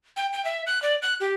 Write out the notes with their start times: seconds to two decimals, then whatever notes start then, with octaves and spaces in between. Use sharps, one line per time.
0.17 G5
0.33 G5
0.45 E5
0.67 F#6
0.82 D5
1.02 F#6
1.20 G4